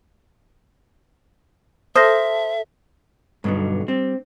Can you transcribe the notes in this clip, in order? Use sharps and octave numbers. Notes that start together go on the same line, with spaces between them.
A4 C5 E5 D#6 F6 A#6
B1 G2 B2 D3
G3 C4